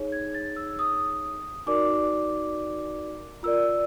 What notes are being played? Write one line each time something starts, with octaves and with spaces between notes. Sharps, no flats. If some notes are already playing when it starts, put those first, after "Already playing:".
Already playing: D#4 G#4 C#5
G#6
A6
E6
D#6
D#4 F#4 A#4 D5 D6
F4 A#4 D5 E6